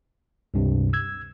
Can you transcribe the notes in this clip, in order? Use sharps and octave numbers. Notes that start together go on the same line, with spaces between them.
C#2 G2 C3
E6 G#6